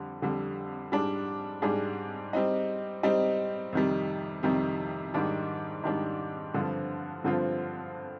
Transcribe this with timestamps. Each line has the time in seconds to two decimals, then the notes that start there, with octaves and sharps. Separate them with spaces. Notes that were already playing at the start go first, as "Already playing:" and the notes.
Already playing: F2 D3 G3
0.22 F2 D3 G3
0.92 G#2 G3 D4 G#4
1.62 G#2 G3 D4 G#4
2.33 G3 C4 D#4
3.03 G3 C4 D#4
3.73 F2 C3 D#3 G3
4.43 F2 C3 D#3 G3
5.14 G#2 D#3 G3 D4
5.83 G#2 D#3 G3 D4
6.54 G2 D3 F3 C4 F4
7.24 G2 D3 F3 C4 F4